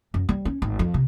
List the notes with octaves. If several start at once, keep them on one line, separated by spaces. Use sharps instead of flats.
F#2
G3
C#4
G#1
F2
C3